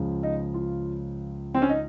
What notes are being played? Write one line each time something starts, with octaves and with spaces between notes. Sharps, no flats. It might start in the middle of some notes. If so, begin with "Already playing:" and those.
Already playing: C#2 C#3 F3
D#4
F4
C4
C#4
D#4